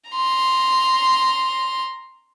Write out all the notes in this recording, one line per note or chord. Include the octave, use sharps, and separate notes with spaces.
A#5 C6